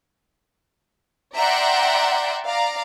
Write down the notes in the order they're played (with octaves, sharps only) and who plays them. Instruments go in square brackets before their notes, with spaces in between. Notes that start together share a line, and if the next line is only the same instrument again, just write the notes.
[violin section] D5 E5 F#5 G5 A#5 C6
D5 F5 A#5